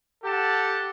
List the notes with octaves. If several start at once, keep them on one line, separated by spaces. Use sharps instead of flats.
G4 A4 F#5 A5